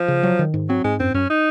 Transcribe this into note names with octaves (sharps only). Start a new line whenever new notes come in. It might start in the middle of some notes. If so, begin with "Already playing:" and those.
Already playing: F3
C#3
F#3
D#3
G#2
F#3 C4
G#2 G#3
F#2 C4
F#2 C#4
D#4